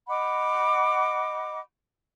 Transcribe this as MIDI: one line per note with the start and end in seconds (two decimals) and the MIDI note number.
0.08 1.59 75
0.08 1.59 78
0.08 1.59 83
0.08 1.59 86